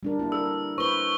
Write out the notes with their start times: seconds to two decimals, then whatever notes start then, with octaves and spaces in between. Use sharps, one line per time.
0.03 G3 D4 A#4
0.19 A#3 E4
0.32 A4 A#4 E6
0.78 E4 B4 C5 C#6 G7